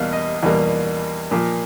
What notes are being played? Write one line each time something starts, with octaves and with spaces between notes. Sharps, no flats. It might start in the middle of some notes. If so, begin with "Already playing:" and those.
Already playing: E2 B2 G3 A#3 F5
D#5
E2 B2 G3 A#3
A#2 F3 A#3